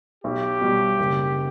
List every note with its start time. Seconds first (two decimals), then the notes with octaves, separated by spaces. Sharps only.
0.24 B1 G4
0.61 B2 G3
0.99 F#1